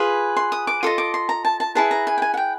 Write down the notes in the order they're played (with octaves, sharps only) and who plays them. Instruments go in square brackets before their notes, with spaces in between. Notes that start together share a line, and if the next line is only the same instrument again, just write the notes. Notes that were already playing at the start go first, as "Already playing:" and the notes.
Already playing: [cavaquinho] F4 G#4 B4 B5
C6
D#6
D6
F4 A4 D#5 D#6
D6
C6
A#5
A5
A5
E4 G#4 B4 A5
A#5
G#5
G5
G#5
F#5
G5